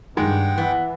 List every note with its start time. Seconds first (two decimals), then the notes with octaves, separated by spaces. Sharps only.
0.17 G2 D#3 G#3 F#5 G5
0.58 E3 B3